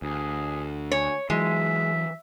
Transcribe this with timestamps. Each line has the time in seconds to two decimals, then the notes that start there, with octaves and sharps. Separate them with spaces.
0.02 D2 G#4
0.91 C#5 G#5
1.30 E3 F#3 G#3 E5